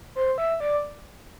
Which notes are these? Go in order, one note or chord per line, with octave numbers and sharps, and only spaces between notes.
C5
E5
D5